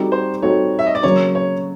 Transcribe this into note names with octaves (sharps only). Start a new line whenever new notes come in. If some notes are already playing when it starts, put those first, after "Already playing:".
Already playing: G3 C4 D#4 F#4 A4
C5
G3 C4 D#4 F#4 A4 C#5
E5
D#5
D5
C#3 F#3 A#3 C#5
C#5